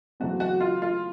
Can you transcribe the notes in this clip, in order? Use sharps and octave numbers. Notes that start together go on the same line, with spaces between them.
E2 C#3 F#3 A3 C4 F#4
F#4
F4
F4